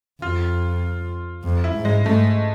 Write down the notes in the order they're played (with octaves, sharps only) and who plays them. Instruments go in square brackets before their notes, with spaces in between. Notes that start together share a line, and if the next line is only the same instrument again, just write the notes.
[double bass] F2 [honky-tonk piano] F4
[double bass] F2
[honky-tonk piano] E4
[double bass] G#2
[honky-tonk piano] G#3
[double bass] G#2 [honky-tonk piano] A3